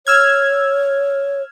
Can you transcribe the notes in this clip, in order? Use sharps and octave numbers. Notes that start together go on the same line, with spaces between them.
C#5 E6 F6 G#6